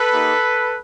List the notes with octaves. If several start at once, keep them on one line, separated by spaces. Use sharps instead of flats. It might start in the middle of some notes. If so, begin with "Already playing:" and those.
Already playing: A4 B4
A#3 D#4 G4